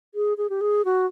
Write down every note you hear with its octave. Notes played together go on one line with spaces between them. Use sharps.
G#4
G#4
G4
G#4
F#4